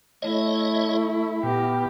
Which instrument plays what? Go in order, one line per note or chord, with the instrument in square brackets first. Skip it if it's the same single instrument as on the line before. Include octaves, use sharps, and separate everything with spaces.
[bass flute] A3 [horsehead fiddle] E4 [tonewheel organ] C#5 D#5
[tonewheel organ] A#2 [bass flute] B3 [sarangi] G4